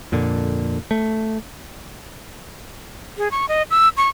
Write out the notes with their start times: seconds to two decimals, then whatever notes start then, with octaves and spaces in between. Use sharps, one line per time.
0.12 F2 A#2 D3
0.91 A3
3.18 G#4
3.31 C#6
3.49 D#5
3.71 E6
3.97 C#6